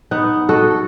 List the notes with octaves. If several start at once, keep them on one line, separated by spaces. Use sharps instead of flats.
B3 D#4 F#5
F#4 A4 D#5